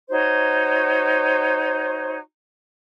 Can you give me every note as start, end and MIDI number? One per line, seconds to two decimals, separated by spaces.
0.09 2.17 63
0.09 2.17 66
0.09 2.17 72
0.09 2.17 73